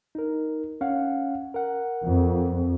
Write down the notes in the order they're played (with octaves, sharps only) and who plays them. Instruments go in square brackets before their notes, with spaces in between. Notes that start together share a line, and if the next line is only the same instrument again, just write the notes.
[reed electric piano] D#4 A#4
C#4 F5 F#5
A#4 F#5
[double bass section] F2